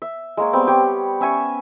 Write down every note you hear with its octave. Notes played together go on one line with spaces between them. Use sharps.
E5
G#3 A#3 C#5
G3 B3 C4
G4 C#5
C#4 E5 G#5 C#6